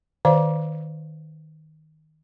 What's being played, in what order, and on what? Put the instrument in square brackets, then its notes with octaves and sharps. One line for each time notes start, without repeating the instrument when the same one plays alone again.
[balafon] D#3 C5 D5 F5 D6